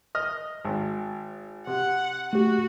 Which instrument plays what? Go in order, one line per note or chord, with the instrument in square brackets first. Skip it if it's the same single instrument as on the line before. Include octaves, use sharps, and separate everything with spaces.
[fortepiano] D#5 F6
G#1
[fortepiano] C3 [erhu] F#5
[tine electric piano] A3 G4 [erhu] F#4